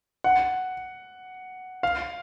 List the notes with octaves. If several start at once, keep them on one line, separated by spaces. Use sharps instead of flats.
F#5
F5